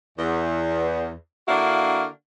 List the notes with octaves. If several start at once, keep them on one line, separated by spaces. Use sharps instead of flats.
E2
D3 A#3 D4 E4 F#4 F5